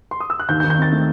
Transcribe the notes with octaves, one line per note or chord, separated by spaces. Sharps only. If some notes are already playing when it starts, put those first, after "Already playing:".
C6
D#6
E6
F#6
D#2 G6
G6
D#3
G6
C4 A6
A3